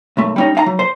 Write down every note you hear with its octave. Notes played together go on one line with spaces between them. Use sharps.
B1 F#2 A3
G3 C#4 D#4
D#4 F5 A#5
F#3
C5